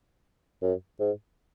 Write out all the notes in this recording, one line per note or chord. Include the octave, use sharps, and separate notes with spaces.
F#2
G#2